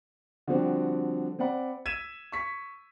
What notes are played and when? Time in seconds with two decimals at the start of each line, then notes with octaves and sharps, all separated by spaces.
0.48 D3 F3 G3 C4 F#4
1.39 C4 D5 F#5 B5
1.86 E6 G#6 B6 D#7 E7
2.32 C#6 B6